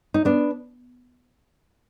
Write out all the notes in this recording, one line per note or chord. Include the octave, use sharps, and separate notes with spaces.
D#4
B3 D4